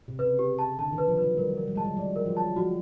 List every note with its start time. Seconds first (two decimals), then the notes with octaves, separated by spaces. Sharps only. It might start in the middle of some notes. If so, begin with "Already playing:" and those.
0.08 C3
0.19 C#3 B4
0.39 G4
0.59 A5
0.79 D3 A5
0.93 D#3
0.98 B4
1.08 F3
1.18 F#3 B4
1.37 G3 A#4
1.57 A#4
1.68 G3
1.75 G#3 A5
1.84 G3
1.97 F#3 D5
2.16 A#4
2.26 F3
2.37 A5
2.56 F3 F#4